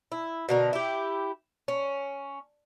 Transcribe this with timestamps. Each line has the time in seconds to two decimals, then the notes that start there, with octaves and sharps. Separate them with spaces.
0.12 E4
0.49 B2 D3 A#4
0.73 E4 G4
1.68 C#4